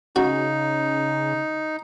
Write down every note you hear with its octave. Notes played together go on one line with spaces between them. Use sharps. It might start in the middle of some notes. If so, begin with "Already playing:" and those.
C#3 D#4 F#4